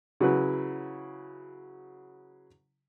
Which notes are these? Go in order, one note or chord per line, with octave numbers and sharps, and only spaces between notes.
C#3 F#3 E4 F#4 B4